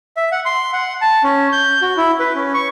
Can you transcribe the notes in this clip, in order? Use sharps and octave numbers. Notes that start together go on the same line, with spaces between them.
E5
F#5
C6
F#5
A5
C#4
G6
F#4
E4
B4
C#4
C#6